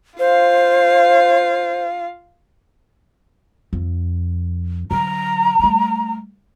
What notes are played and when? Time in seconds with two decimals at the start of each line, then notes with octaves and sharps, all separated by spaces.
0.19 F4 C5 F5
3.73 F2
4.91 D3 F#3 A#5
5.59 G3 A3